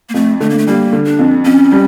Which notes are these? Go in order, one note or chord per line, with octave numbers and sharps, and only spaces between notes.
A#3
F2 A3
D3 A3
A#3
A3
G3 A#3
D3
D4
F2
F2 C#4
G3